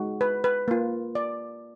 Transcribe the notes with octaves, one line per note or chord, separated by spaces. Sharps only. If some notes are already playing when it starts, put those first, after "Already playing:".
Already playing: G#3 D#4 F#4
B4
B4
A#3 F4
D5